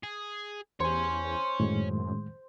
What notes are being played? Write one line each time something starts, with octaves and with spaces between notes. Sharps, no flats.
G#4
E2 C5 C#5 G#5
F#2 A2 D#3 G#3